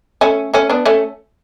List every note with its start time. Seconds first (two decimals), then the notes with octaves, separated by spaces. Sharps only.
0.21 A3 C#4
0.54 A3 C#4
0.70 B3 D4
0.86 A3 C#4